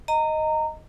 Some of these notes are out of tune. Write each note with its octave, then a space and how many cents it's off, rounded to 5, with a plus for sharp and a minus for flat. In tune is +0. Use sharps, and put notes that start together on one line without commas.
D#5 +0 A#5 -20